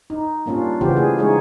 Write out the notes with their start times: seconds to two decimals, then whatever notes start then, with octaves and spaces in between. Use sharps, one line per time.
0.10 D#4
0.46 G3 A#3 C#4 D4 F4
0.81 C#3 E3 B3 F4 G4 C5
0.96 A3 G#4
1.18 G#3 D#4 G#4 C#5